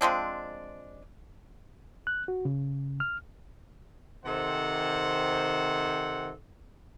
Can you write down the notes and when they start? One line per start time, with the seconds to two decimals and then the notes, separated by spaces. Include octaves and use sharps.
0.01 F3 G#3 C4 D4
2.07 F#6
2.28 F#4
2.45 C#3
3.00 F6
4.25 C3 D#3 A4 C5 F#5